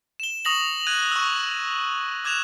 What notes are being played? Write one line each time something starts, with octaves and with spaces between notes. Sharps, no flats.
E7 G7
C#6 D#6 A#6 F#7
F#6 G#6 D#7
C#6 E6
D6 F#6 G#6 E7 F7